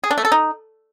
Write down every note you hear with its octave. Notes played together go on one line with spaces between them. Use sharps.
G#4
D4
A3
A4
D#4